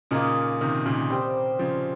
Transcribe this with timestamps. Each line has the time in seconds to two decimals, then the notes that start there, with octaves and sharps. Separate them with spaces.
0.11 A#2 C#3 A#3 D#4 A#4 D#5
0.61 C3 D#3
0.86 A#2 C#3
1.10 G3 C4 G4 C5
1.59 C#3 F3